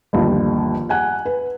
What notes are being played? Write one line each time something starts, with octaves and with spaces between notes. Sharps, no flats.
G1 D#2 F3
F#5 G#5 F#6
B4